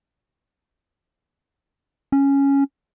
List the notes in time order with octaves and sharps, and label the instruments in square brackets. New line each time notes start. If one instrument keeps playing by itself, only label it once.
[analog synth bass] C#4